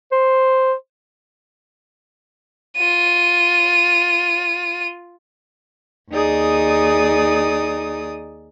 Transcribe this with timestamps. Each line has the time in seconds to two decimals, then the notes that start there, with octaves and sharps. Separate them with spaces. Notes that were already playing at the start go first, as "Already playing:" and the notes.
0.11 C5
2.76 F4 D#7
6.11 D#2 D#4 G#4 D5 D#6